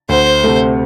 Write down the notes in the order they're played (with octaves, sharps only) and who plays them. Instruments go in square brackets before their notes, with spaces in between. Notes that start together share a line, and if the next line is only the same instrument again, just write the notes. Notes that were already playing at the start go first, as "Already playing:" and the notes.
[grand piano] D2 [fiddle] C5
[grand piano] C3 A3